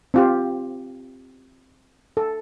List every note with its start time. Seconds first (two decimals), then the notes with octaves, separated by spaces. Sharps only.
0.14 C4 F4 G4
2.17 A4